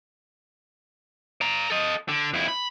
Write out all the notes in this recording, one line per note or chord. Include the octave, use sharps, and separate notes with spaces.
D5 A#5
A4 D#5
D3
F2 E4
B5